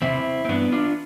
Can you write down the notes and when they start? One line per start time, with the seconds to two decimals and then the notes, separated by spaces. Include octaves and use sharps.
0.02 E2 C3 E3 C4 E4
0.45 C4
0.49 G2 E3 B3 D4
0.72 D4 F4